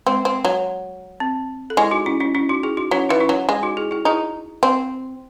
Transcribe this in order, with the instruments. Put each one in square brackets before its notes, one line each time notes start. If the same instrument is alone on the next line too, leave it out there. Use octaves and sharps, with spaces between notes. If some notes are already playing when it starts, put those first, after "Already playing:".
[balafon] G#3 [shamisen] C4
[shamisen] C4
F#3
[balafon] C4
A4
[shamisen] G#3 [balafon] E4 G#4
[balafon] D#4 F#4
C#4 E4
C#4 E4
C#4 E4
D#4 F#4
E4 G#4
D#4 F#4
[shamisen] F#3 [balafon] C#4 E4
[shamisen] E3 [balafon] D#4
[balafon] C#4 E4
[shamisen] F#3
G#3
[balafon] D#4 F#4
E4 G#4
E4 G#4
[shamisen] D#4 [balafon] E4 G#4
[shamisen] C4